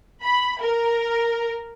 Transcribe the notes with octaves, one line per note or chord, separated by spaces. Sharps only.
B5
A#4